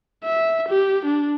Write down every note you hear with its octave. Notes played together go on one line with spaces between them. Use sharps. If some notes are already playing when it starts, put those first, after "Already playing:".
E5
G4
D4